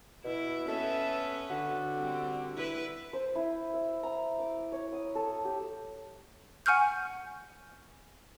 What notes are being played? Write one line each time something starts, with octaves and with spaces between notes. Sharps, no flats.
B2 E4
B3 C#4 A4 B4 E5
D3 F#4
G3 C4
E4 B4
C5
E4
E5
A#5
D6
C#5
D#6
A4
G4
F#5 G#5 C#6 F6 G6